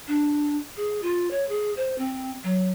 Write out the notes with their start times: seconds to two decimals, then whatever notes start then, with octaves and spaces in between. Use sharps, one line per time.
0.08 D4
0.77 G#4
1.02 F4
1.31 C#5
1.49 G#4
1.77 C5
1.98 C4
2.44 F#3